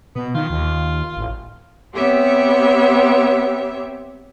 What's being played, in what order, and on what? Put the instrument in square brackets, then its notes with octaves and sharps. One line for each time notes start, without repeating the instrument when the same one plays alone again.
[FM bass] B2 [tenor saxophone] B3
[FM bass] D#3 [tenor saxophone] F4
[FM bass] D#2
A1
[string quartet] B3 C4 G4 C#5 E5